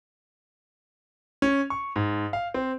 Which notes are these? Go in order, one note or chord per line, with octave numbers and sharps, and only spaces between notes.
C#4
C#6
G#2
F5
C4